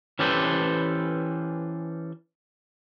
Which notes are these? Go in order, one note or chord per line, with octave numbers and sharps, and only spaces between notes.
E3 C#4 G4 A4 B4 C5